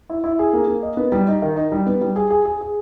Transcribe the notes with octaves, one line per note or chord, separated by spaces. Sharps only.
E4
E4
G#4
A#3
A#3
D#5
B3
G3
D#4
D#3
D#4
G3
B3
G3
G#4
G#4
G#4
G#4